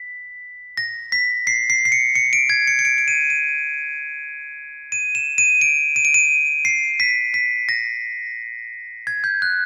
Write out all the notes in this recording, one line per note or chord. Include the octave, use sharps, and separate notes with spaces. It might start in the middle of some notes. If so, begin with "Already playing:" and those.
Already playing: B6
A#6
B6
C7
C7
C7
C#7
C#7
D7
G#6
C#7
C#7
D7
D7
D#7
D#7
D#7
E7
D#7
D7
D#7
D7
D#7
C7
B6
B6
A#6
G#6
G6
F#6